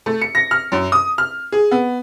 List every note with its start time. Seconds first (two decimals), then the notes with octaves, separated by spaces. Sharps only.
0.06 A3
0.21 C#7
0.35 A#6
0.51 F6
0.72 F#2
0.92 D#6
1.18 F6
1.52 G#4
1.71 B3